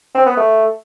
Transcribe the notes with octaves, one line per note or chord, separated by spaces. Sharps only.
C4
B3
A3